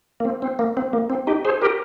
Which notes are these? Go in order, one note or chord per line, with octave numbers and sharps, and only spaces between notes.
A#3
C4
C4
A#3
C4
A#3
C4
D#4 G4
G#4 C5
G4 A#4